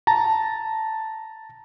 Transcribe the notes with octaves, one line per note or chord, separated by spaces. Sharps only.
A5 A#5